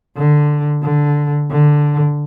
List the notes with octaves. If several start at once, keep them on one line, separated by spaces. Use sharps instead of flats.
D3
D3
D3